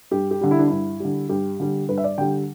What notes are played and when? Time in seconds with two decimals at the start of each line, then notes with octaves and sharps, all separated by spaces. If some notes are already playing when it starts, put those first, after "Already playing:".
0.11 G2 G4
0.31 G4
0.41 D3 G3
0.51 E4
0.59 D4
0.67 G2 E4
1.00 D3 G3
1.29 G2 G4
1.60 D3 G3
1.89 G2 B4
1.98 E5
2.04 D5
2.18 D3 G3 G5